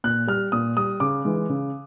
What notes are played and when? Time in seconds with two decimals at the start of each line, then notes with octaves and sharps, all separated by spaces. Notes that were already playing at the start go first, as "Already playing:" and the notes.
0.04 A#2 F#6
0.27 G3 F6
0.52 A#2 D#6
0.77 G3 D#6
1.00 C#3 D6
1.25 E3 G#3
1.49 C#3